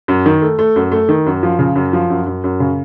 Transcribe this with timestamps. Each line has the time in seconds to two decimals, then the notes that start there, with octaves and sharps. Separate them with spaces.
0.08 F#2
0.26 D#3
0.42 A3
0.59 A3
0.76 F#2
0.92 A3
1.09 D#3
1.26 F#2
1.43 F3
1.59 C#3
1.76 F#2
1.93 F3
2.10 F#2
2.26 F#2
2.44 F#2
2.60 C#3